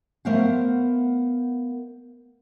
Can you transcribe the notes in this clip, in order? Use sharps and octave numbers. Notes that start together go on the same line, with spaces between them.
A3 B3 A#4 C5 F5 F#5